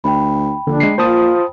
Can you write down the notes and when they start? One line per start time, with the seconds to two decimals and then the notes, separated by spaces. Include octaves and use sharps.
0.04 D2 G5 B5
0.67 A#1 D3 D4
0.80 G#3 C7
0.98 A#2 F4 C5 A5 D#6